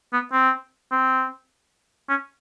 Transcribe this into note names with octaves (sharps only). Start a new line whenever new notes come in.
B3
C4
C4
C#4